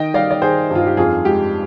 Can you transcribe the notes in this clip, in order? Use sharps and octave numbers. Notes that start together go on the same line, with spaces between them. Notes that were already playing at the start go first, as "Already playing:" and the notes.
Already playing: D#3 D#5 G5
G3 D5 F5
D5
D#3 G#4 C5
G2
F4
G4
F2 F4 G#4
G#3 G4